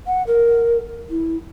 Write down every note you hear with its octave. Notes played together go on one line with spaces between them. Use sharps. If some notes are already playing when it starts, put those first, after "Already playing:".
F#5
A#4
E4